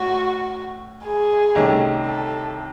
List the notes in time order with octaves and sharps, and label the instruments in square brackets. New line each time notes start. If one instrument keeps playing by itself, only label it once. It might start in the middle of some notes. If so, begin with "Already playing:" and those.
Already playing: [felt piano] A2 C#4 [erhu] F#4
[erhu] G#4
[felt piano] C2 C3 D#3 A3 C#4
[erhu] A4